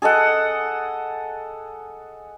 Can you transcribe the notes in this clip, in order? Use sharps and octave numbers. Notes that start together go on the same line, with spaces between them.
G#4 A4 D#5 F#5